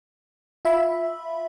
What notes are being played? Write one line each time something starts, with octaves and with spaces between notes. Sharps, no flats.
F4 E5 B5